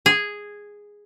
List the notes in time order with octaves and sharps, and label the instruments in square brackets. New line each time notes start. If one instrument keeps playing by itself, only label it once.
[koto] G#4